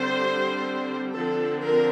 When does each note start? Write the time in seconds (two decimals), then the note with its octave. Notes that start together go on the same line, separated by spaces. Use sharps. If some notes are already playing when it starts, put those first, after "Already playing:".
Already playing: D3 G3 C4 C5
1.15 D3 F3 C4 A4
1.62 A#4